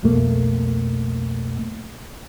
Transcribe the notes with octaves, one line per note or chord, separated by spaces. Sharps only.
C2 F2 B2 A3 A#3